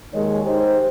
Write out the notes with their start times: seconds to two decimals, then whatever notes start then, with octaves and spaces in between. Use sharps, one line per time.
0.13 D#2 D#3 G#3 C#5
0.45 D#4 G4 C5